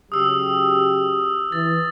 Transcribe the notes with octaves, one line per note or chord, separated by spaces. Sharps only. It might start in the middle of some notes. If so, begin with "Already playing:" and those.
C#3 F#3 G4 D#6 E6
E3 A6